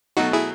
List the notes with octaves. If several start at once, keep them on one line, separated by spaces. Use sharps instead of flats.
B2 F#3 A3 D#4 F#4
E4 G#4